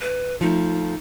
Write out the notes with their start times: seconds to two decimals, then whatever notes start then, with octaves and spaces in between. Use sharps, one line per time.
0.01 B4
0.41 F3 A3 D#4